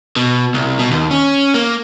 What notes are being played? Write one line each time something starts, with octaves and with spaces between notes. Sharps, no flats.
B2
C2
B2
D#2
C#4
A#3